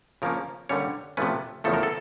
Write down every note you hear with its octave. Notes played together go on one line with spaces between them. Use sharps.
C#3 F3 A#3 C#4 A#4
D3 G3 A#3 C#4 C#5
C3 F3 A3 C#4 B4
E2 C#3 F3 A3 A4
A#4
A4